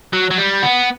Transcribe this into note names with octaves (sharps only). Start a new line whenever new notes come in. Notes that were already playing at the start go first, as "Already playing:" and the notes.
F#3
F#3
G3
B3